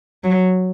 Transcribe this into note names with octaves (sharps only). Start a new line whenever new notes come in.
F#3